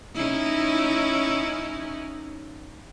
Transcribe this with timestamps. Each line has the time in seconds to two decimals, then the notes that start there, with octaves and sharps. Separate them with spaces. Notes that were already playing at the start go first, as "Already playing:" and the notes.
0.14 C#4 D#4 E4